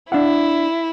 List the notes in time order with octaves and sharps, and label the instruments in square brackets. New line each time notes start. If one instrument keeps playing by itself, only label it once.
[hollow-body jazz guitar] D4 F5 F#5 [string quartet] E4